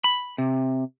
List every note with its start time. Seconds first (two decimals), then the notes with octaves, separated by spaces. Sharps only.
0.04 B5
0.38 C3